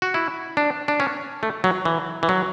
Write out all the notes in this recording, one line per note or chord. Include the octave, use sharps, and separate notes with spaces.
F#4
E4
D4
D4
C#4
A3
F#3
E3
E3
F#3